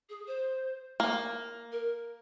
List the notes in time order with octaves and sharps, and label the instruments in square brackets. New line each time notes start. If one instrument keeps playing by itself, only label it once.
[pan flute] G#4
C5
[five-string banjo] A#3
[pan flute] A#4